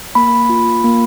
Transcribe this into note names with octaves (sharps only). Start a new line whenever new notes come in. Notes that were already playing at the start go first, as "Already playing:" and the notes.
A#3 B5
F4
A#3